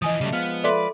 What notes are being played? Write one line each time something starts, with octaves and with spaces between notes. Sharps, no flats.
E3 F3 D#5 G#5 D#6
C#3 F#3 G3 A3
F3 G#3 B3 F5
A4 B4 D5 E5 C6